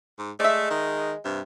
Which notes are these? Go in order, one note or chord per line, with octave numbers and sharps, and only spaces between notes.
G#2
G#3 A3 D5 E5
D#3
G2 C3